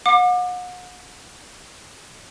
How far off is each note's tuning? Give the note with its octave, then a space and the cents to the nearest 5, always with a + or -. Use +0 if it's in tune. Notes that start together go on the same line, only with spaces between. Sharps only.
F#5 -40 D6 +30